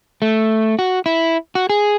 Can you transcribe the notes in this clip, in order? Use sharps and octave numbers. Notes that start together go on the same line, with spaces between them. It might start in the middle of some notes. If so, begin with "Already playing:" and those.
A3
F#4
E4
F#4
G#4